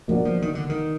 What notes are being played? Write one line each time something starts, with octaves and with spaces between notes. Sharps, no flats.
B2 F3 A#3 D4 F#4 D5
F3
D#3
D3
D#3